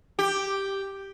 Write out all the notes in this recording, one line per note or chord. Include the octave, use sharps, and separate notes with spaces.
G4